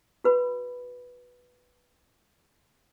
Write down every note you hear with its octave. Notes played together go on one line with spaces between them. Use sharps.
F#4 B4 B5